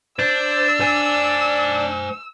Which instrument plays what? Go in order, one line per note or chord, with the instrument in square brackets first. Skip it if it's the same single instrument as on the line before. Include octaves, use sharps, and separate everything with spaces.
[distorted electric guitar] D4 [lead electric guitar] C5 [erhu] E6
[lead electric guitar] C5 G#5